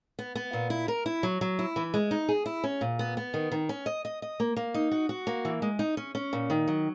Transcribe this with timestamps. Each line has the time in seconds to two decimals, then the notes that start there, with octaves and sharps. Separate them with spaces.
0.19 B3
0.35 B3
0.53 A#2
0.70 E4
0.88 A#4
1.06 E4
1.23 F#3
1.41 F#3
1.59 E4
1.76 E3
1.94 G#3
2.11 D#4
2.29 G#4
2.46 E4
2.64 C#4
2.81 A#2
2.99 B3
3.17 B3
3.34 D#3
3.52 D#3
3.69 C#4
3.86 D#5
4.05 D#5
4.22 D#5
4.40 A#3
4.57 A#3
4.74 D#4
4.91 F#4
5.09 F#4
5.27 A#3
5.45 E3
5.62 G#3
5.79 D#4
5.97 C#4
6.15 C#4
6.33 A#2
6.50 D#3
6.67 F#3